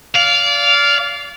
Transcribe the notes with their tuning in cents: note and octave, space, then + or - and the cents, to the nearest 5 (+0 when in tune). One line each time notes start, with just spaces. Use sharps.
D5 -30 F5 +0